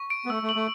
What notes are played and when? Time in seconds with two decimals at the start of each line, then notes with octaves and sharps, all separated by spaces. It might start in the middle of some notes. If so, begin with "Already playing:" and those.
Already playing: C#6
0.10 D7
0.25 B3
0.29 A3 E6
0.43 A3
0.49 F#7
0.55 A3